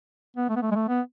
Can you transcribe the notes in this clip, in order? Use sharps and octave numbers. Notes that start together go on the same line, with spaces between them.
B3
A3
B3
A3
G#3
A3
B3